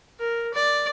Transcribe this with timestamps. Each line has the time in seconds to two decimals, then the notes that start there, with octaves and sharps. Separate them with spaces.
0.19 A#4
0.54 D5